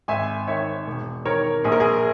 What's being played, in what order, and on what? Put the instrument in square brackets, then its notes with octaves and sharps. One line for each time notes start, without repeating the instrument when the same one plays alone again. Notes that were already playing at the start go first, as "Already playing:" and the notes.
[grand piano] G#1 E5 G#5
D#3 C#5 E5
E1
D#3 A#4 C#5
A#1 G#4
A#4
G#4